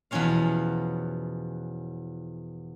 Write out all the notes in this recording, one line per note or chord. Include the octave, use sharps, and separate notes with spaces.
E2 B2 F3 C#4 C#5 F5